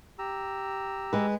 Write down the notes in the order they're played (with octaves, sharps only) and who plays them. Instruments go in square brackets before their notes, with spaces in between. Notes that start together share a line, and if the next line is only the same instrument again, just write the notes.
[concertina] G4 A#5 E6
[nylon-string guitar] G#3 B4